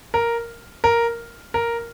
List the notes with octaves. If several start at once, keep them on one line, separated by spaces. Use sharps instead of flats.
A#4
A#4
A#4